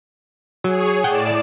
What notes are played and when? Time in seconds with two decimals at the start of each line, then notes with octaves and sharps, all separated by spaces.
0.64 F#3 G#4 C#5
1.04 A2 D5 F#5 G5 E7